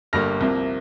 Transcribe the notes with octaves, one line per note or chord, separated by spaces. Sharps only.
G1 G2 D3 G3 A#3 F6 A#6
C2 C3 F3 A#3